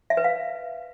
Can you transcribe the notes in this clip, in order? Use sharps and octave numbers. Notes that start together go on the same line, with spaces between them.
E5
B4
F5